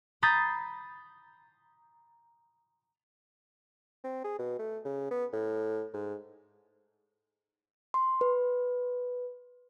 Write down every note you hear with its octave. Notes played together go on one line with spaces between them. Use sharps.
A#5 B5 D#6 G6 A6 C7
C4
G#4
B2
A3
C#3
B3
A2
G#2
C6
B4